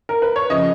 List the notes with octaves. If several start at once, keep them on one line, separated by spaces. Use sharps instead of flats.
A#4
B4
C#5
C#3 F3 D#5